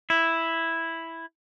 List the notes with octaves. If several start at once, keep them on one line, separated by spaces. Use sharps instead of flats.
E4